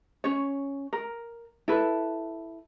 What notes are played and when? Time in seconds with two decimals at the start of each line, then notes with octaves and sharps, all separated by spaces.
0.24 C#4 C#5
0.93 A#4
1.68 E4 A4 B4